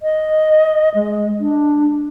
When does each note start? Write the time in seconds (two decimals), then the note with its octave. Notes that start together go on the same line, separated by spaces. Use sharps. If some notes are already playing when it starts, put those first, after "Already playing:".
0.03 D#5
0.95 G#3
1.40 D4